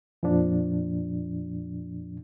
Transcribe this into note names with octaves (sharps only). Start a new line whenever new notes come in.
F2 A#2 F3 D4